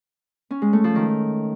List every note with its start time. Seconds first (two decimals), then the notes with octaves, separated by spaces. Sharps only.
0.51 C#4
0.62 G#3
0.73 A3
0.84 F3
0.95 D#3